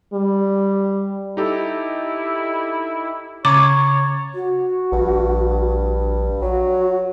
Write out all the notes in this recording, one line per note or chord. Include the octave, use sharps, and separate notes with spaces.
G3
D#4 E4 G4 A4
C#3 C#5 A#5 D6 G#6 A6
F#4
A#1 G2
F#3 F#4